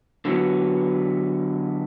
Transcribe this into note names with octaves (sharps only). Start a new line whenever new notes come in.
D3 F#3 B3